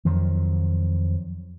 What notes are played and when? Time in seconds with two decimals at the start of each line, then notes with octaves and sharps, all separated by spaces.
0.05 F2 D#3 F3 F#3